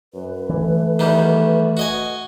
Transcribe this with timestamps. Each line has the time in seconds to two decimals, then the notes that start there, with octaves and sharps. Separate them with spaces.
0.14 F#2 B4
0.49 E3 A3
0.99 E2 D#3 G3
1.77 F#4 D#5 G#5